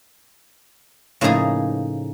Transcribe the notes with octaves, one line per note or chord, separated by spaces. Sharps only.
A2 C#3 F3 A#3 D#4 G#4